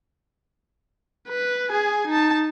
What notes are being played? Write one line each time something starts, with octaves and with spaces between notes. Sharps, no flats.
B4
G#4 G#5
D#4 A5